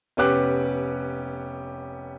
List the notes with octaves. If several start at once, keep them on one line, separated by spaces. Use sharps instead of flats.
F1 B3 C#4 G4 D6 F#6